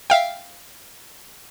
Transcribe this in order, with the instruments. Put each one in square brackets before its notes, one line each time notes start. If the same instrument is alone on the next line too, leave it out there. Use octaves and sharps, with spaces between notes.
[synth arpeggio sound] E5 F5 G5